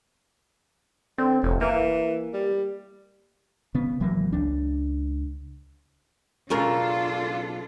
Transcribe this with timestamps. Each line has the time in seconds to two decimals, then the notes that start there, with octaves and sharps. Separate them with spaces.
1.18 D3 C4
1.43 F1 A2
1.61 E3 A#3
2.34 G3
3.75 C#3 B3
4.00 G#1 E3 F#3 A#3
4.32 C#2 D4
6.50 B1 C#3 D4 F4 A4 A#4